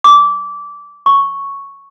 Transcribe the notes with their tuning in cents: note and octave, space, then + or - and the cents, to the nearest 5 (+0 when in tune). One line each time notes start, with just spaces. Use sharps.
D6 -20
C#6 +0